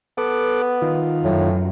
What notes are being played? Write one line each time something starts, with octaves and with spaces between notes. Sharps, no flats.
B3 A4 F#5 D6
D#3 F4
F#2 A2